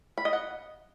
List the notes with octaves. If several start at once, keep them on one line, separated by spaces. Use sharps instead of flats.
B5
D#5
F#5